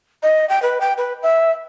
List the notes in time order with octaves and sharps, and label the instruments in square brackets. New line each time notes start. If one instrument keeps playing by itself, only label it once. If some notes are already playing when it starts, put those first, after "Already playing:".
[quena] D#5
G5
B4
G5
B4
E5